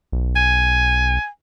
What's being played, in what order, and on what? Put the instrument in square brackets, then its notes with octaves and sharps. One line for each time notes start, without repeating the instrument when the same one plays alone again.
[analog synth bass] B1
[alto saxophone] G#5